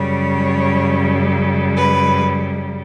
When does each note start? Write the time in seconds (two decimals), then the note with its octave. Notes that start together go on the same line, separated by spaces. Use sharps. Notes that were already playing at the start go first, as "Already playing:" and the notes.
Already playing: F#2 C#3 G3 C#5
1.77 B4